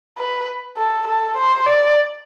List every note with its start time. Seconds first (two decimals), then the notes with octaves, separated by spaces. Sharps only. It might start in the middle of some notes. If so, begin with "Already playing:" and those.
0.18 B4
0.77 A4
1.07 A4
1.37 C5
1.66 D5